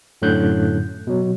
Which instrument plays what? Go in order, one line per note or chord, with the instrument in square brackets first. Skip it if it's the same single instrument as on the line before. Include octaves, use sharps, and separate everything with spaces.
[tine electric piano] F#2 A2 D3 F#3 F#6 G6
B2 F#3